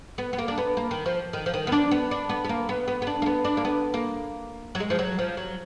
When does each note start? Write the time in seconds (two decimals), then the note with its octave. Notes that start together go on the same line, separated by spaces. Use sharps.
0.18 B3
0.33 B3
0.38 A#3
0.48 D4
0.58 B3
0.77 A#3
0.91 D#3
1.06 F3
1.33 D#3
1.46 F3
1.54 D#3
1.67 B3
1.72 D4
1.91 B3
2.11 D4
2.29 B3
2.44 B3
2.49 A#3
2.69 B3
2.88 B3
3.02 B3
3.07 D4
3.22 A#3
3.26 B3
3.45 D4
3.57 A#3
3.65 B3
3.94 A#3
4.75 F#3
4.80 G#3
4.90 F3
4.99 F#3
5.19 F3
5.37 F#3